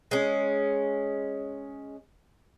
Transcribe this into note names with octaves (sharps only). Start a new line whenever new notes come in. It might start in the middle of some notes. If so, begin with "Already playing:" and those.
G#3 C#4